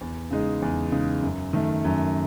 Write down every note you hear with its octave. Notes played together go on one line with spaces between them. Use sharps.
E2
C#3 G#3 D#4
E2
C#3 G#3 D#4
F#2
D#3 A3
F#2